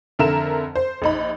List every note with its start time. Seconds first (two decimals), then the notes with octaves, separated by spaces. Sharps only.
0.19 F2 D3 A#4 E5 E7
0.76 C5
1.02 A#1 D#4 B5